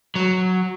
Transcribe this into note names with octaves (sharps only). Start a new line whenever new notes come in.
F#3